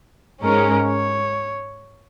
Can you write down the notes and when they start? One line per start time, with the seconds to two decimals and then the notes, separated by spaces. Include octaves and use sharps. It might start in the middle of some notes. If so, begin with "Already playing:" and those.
0.43 G#2 G#3 C#4 A#4
0.87 C#5